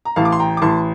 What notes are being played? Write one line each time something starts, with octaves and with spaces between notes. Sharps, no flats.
A#5
A1 F5 A5
D6
C6
G5 A#5
D6
A1 A5 C6